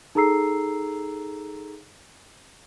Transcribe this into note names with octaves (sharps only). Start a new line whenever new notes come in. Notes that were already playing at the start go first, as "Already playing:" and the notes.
D#4 G#4 A4 A#5 E6 C7